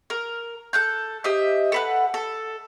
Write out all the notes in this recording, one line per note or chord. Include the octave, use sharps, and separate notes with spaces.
A#4
A4 F#6 G6
G4 C5 D#5 E5
A4 B4 F#5
A4